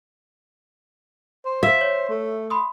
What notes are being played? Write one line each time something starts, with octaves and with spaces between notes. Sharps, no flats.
C5
E5 F5
C#5
A3
B5 C6 D#6